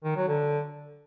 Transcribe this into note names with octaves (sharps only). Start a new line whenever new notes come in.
D#3
F#3
D3